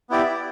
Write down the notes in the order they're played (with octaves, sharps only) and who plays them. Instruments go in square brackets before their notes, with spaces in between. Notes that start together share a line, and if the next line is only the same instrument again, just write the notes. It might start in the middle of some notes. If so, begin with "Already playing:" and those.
[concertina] B3 E4 G4 D5